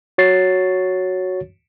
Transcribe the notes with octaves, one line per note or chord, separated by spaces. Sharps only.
F#4 C#5 A6 C7